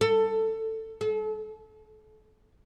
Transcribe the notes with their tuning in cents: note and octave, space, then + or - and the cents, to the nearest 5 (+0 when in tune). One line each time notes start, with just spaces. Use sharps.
A4 +15
A4 -35